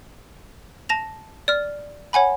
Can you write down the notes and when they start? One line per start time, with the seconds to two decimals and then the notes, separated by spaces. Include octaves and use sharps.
0.89 A5 A#6 F7
1.48 D5 F6
2.13 C#5 F#5 G#5 B5